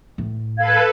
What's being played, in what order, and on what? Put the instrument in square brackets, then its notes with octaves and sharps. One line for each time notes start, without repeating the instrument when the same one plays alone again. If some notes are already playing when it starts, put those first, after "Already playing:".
[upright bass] A2 E3
[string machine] A4 B4 [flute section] F5 G#6